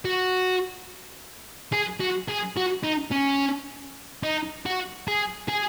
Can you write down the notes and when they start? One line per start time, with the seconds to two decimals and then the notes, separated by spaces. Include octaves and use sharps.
0.05 F#4
1.72 G#4
2.00 F#4
2.28 G#4
2.57 F#4
2.84 D#4
3.12 C#4
4.23 D#4
4.66 F#4
5.08 G#4
5.49 G#4